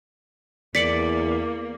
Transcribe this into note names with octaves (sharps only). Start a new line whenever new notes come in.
E2 A#3 D5 B6 C#7 F#7